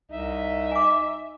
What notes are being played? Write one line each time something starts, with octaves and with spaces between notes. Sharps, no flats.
C2 D#4 E5
G#5 D6